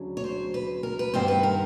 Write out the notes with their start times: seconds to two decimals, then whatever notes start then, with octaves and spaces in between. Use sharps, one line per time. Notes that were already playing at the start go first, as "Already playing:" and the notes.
Already playing: D2 C#3 F#3 D4
0.17 C#5
0.24 C5
0.54 B4
0.83 A#4
0.99 B4
1.14 G2 D#3 G3 B3 C5
1.28 B4
1.43 A#4